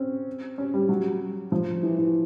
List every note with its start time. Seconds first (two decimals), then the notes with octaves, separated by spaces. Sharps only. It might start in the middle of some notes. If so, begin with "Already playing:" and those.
Already playing: C4 C#4
0.58 C#4
0.74 G3
0.89 F#3
1.52 F3
1.83 E3
1.99 E3